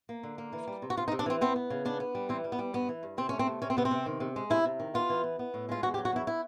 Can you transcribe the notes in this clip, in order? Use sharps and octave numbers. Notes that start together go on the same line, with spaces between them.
A#3
D3
A#3
E3
G3
C3
F#4
C3 F4
D#4
C3
D4
E3 C4
B3 C4
B3
C#3
B3 D4
B3
G3
E3 C4
G3
B3
G3
G2 B3
E3
G2
C3 C4
A3 C#4
C4
C3
C3 C#4
C4
C3 B3
C4
C3
D#3
C3
G#3
C3 E4
C3
D#3
B3 F4
E3
B3
B3
A2
G#3 F4
E2 F#4
G4
F#3
F#4
E2 E4
E4